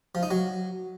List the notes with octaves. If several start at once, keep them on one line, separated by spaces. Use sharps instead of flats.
F3
D#4
F#3